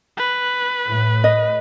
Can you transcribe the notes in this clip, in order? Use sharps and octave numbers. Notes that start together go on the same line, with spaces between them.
B4
A2
D#5